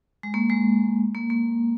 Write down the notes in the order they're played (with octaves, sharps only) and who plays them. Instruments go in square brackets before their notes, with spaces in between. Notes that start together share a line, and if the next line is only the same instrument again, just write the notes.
[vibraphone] G#3
A#3
G#3
A#3
A#3